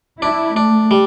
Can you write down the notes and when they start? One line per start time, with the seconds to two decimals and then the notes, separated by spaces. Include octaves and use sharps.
0.22 D4 E4
0.56 A3 D4
0.91 G3